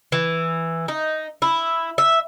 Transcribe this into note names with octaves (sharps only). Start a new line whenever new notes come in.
E3
D#4
E4
E5